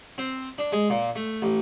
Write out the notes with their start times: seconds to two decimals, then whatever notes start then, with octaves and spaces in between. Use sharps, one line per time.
0.18 C4
0.58 D4
0.72 G#3
0.90 A#2
1.16 A3
1.42 A1